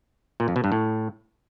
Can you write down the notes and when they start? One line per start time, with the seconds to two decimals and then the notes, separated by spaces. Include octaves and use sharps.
0.40 A#2
0.48 F2
0.56 B2
0.64 G2
0.72 A2